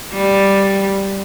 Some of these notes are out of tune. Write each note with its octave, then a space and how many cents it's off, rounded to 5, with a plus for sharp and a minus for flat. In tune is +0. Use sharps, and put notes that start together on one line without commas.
G3 +0